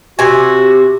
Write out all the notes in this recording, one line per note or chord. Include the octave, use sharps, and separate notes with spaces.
C3 F#4 G#5